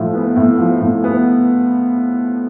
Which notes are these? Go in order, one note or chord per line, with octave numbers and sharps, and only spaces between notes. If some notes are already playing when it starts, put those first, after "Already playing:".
Already playing: A2 F3
B3
A2
F3
A2
B3